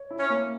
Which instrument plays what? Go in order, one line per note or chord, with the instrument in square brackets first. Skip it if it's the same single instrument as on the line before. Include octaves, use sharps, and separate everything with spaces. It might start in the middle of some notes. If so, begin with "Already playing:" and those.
Already playing: [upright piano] C#5
E4
[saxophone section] C#4
[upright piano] A#3